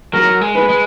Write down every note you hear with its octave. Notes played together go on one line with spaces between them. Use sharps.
F#3 A#4
G#3
B4
G#3